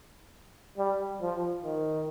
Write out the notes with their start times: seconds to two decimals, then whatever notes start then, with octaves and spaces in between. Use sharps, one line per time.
0.78 G3
1.22 F3
1.64 D#3